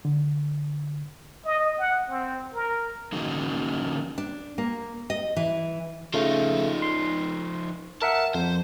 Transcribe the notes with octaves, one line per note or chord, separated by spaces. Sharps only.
D3
D#5
F#5
C4
A#4
D3 E3 F#3 A#3 C#4 D#4
D4
A#3
D#5
E3
C#3 F3 A3 D#4
C6
A#4 E5 F#5 A5
F2 C5